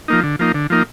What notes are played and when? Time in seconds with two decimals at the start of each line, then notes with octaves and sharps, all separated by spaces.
0.08 F3 A#3 D#4
0.23 D3
0.39 F3 A#3 D#4
0.54 D3
0.70 F3 A#3 D#4